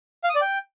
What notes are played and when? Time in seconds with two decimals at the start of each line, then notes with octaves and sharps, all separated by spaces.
0.24 F5
0.30 D#6
0.35 D5
0.41 G5